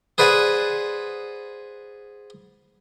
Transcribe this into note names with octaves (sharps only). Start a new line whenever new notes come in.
G#4 B4 C5 D5 F#5 G#5